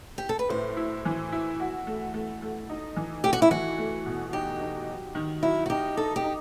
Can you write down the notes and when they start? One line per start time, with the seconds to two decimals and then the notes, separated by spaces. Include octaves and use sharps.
0.18 G4
0.29 A4
0.39 B4
0.49 A2 C5
0.77 E4
1.05 E3
1.32 E4
1.60 F#4
1.87 A3
2.14 A3
2.42 A3
2.69 D#4
2.97 E3
3.24 A3 G4
3.33 F#4
3.42 E4
3.51 E3 F#4
3.78 A3
4.06 B2
4.33 D#4 G4
4.61 D#4
4.88 F#3
5.15 D#3
5.43 F#3 E4
5.66 F#4
5.70 D#4 G4
5.97 D#4 A4
6.16 G4
6.24 D#4